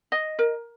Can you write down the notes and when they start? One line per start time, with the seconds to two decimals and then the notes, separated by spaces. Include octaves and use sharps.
0.12 D#5
0.39 A#4